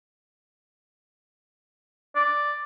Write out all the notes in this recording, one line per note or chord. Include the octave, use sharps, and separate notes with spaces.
D5